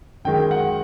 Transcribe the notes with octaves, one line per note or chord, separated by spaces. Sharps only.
F#2 D#3 G#3 G5
F#5